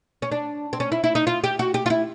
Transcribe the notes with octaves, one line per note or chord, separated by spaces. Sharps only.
C#4
D4
C4
C#4
E4
E4
D#4
F4
G4
F#4
G4
F4
E4